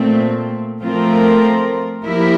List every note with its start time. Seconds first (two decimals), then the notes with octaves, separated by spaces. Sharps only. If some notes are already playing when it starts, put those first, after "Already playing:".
Already playing: A#2 A3 C4
0.81 F3 A3 C4 F4 A#4
2.03 F3 A#3 E4 G4 A#4